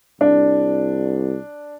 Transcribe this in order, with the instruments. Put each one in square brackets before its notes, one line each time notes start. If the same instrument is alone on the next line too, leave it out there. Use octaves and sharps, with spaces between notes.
[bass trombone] C2 [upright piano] D4